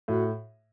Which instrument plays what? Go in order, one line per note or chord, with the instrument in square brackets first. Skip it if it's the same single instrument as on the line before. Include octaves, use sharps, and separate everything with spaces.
[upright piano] A2 [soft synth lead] F#4